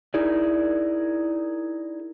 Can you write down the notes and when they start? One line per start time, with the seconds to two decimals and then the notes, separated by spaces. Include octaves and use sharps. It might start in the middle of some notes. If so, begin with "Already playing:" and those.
0.14 D#4 E4 G#4 A#4 D5